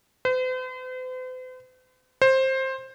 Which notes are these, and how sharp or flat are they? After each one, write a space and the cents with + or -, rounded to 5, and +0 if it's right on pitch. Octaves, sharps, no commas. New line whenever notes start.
C5 -45
C5 +15